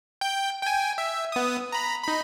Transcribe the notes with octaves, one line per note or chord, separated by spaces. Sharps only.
G5 G6
G5 G#5
E5
B3 D#6
A#5 B5
D#4 B5